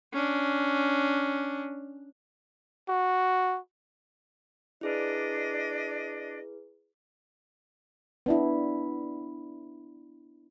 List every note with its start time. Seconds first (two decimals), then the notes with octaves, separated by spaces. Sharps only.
0.13 C#4 D4
2.89 F#4
4.81 D4 E4 G#4 B4 D5 D#5
8.26 B3 D4 E4